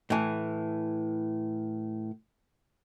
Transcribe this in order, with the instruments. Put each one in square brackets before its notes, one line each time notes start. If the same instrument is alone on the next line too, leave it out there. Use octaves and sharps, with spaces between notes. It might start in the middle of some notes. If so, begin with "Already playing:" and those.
[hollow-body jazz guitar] A2 E3